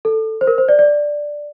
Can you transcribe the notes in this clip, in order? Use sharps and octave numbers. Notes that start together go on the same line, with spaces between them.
A4
C5
A#4
C5
D5
D5